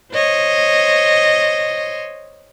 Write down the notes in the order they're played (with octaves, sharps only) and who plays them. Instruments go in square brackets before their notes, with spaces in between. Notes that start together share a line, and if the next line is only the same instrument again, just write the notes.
[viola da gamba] C5 C#5 D#5